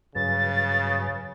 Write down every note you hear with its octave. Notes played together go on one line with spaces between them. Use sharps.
G2 C#3 F#3 B4 A6